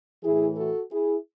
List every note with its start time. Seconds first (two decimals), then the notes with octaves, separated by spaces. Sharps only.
0.23 A2 E3 E4 G#4
0.57 F#4 A4
0.91 E4 G#4